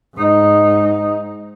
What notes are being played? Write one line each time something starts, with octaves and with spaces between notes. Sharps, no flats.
G#2 D#4